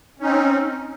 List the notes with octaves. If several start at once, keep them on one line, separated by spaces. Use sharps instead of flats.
C4 C#4 D#4